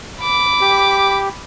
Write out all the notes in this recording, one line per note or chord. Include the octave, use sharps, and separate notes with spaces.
B5 D6
G4